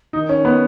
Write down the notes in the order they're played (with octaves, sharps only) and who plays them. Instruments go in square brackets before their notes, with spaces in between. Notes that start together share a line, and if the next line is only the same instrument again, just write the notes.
[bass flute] D#3 [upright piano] D#4
[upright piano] C#4
B3